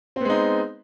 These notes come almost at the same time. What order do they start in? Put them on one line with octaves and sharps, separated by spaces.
C4 B3 G#3 D#4